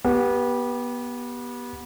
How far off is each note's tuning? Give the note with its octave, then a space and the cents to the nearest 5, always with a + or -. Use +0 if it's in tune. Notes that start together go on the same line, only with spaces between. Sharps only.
B3 -25 G4 +0